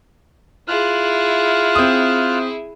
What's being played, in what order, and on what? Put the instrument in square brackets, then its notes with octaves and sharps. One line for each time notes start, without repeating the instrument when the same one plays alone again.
[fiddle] E4 G#4 [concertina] F4 F6 F#6
[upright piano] C4 D#6